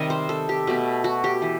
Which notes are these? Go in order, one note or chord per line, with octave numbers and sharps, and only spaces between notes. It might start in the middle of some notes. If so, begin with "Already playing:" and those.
Already playing: C3 D#3 G3 D#5
C5
A4
G4
B2 A3
F#4
G4
E3